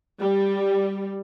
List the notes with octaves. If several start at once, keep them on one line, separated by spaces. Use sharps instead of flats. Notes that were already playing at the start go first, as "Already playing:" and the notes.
G3